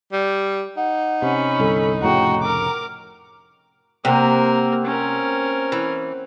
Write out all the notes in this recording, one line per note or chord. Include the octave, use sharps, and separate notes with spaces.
G3
D#4 F#5
C3 C#4 B5
G1 C2 A4
F1 A2 C#3 F#4 G5 A#5
A#4 D6
C3 A#3 C4 A#4 F#5
C#4 A#4
E3